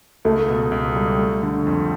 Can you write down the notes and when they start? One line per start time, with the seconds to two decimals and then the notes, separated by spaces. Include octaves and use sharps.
0.25 C#2 A3
0.49 B2
0.72 C#2
0.96 G3
1.19 A3
1.43 D3
1.67 F2